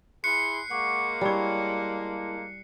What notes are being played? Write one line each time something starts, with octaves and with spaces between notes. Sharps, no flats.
E4 G#4 C6 F#6 C7 C#7
G#3 A#3 F#5 C#6 D6
G3 E4 C#5 A5